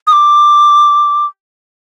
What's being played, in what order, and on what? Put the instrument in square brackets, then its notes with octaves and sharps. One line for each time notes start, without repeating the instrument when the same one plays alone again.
[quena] D#6
D6